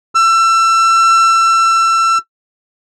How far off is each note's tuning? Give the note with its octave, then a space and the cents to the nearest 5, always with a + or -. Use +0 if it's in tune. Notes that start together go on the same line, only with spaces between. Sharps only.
E6 +30